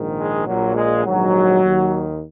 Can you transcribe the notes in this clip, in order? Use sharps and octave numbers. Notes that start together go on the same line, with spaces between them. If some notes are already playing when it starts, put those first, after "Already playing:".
Already playing: A#1 G#2 D#3
G#3
A#1 A#2 F#3
G#3
A#1 G#2 D#3 F#3
D#2 D#3